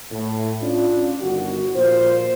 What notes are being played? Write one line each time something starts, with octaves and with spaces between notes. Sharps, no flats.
A2
C#4 D4 F4
G1 D#3 F#4
A#2 F3 C5